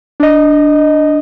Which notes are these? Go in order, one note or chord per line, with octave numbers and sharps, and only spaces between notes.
D4 D#5